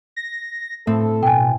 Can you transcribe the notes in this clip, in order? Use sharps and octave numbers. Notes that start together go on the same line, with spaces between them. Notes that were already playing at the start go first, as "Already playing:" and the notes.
A#6
A2 A3 C4 A4
B2 G5 G#5